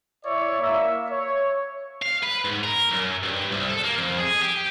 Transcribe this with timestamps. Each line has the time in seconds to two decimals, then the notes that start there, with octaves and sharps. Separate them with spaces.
0.25 E4 C#5 D5 E5
0.61 A#3 E5
1.10 C#5
2.02 F5
2.23 B4
2.45 G#2
2.64 A#4
2.91 F#2
3.23 G2
3.52 C2
3.69 A4
3.84 A#3
3.98 F2
4.18 G#4
4.42 G4